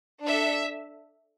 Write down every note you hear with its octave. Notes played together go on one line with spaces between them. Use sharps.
D4 A4 E5